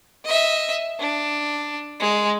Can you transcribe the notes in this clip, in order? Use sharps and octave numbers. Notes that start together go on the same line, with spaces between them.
D#5 E5
D4
G#3